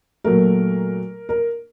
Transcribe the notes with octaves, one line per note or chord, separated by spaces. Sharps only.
A#2 F#3 A3 A#4
A#4